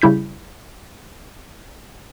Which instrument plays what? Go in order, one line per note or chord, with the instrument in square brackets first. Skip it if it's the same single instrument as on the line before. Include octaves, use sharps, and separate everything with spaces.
[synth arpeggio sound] C#3 G3 E4 G6 B6